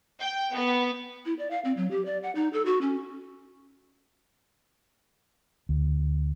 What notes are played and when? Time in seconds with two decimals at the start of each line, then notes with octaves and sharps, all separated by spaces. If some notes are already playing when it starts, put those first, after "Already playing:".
0.19 G5
0.52 B3
1.26 E4
1.39 D5
1.51 F5
1.65 C4
1.77 F#3
1.91 G4
2.06 D5
2.23 F#5
2.35 D#4
2.53 A4
2.66 F#4
2.81 C#4
5.69 D2